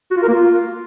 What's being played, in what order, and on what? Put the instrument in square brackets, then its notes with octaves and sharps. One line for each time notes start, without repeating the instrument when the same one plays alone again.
[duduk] F#4
F4
A#4
A#3
F4